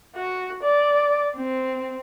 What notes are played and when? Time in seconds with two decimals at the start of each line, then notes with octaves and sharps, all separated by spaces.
0.16 F#4
0.63 D5
1.36 C4